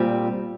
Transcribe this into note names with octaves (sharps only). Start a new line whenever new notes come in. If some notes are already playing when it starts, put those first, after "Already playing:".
Already playing: A#2 G3 C4